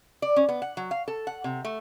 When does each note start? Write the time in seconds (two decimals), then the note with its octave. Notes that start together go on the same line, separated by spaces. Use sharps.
0.22 D5
0.36 C#4
0.49 B3
0.62 F#5
0.77 F#3
0.91 F5
1.08 A4
1.27 F#5
1.44 C3
1.65 A3